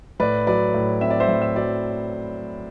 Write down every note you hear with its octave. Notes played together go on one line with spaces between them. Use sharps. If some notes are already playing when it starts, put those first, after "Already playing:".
A2 B4 D5
F#3 B4 D5
A2
C4 E5
D5
C5 E5
A2
E5
F#3 D5